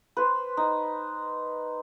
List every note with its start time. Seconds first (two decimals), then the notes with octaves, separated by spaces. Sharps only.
0.17 B4 C5
0.57 D#4